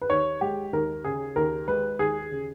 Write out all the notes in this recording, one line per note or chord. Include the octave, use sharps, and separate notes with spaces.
B4
D#2 C#5
G#3 G4
D#2 A#4
C#3 G#4
D#2 A#4
G#3 B4
D#2 G#4
C#3